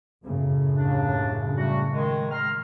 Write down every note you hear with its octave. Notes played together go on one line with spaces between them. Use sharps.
F#2 A2 C#3
D#2 D4
G3 A3 F#4
D#3 G#3
A#5 C6 F6